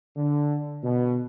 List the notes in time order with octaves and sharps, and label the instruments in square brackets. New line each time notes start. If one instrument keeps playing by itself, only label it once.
[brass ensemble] D3
B2